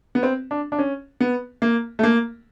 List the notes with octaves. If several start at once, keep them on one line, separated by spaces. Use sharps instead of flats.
B3
C4
D4
D4
C#4
B3
A#3
A3
A#3